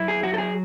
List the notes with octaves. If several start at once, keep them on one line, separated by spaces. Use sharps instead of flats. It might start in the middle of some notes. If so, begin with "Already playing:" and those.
Already playing: F#2 E4
G#4
F#3 F#4
A4
G#4